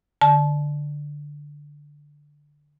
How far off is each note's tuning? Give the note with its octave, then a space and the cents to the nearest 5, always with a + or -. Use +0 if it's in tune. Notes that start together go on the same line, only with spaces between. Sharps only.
D3 +0 A5 -25